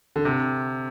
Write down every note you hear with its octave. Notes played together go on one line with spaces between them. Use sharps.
D3
C3